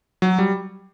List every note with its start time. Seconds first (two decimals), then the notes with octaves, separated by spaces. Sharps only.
0.22 F#3
0.39 G3